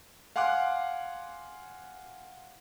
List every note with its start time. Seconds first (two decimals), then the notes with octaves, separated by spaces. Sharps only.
0.36 F5 F#5 G#5 C6 D6 F#6